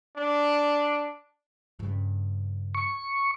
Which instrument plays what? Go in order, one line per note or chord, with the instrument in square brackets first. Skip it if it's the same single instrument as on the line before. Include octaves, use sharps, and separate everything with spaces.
[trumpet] D4
[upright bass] G2 C#3
[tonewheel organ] C#6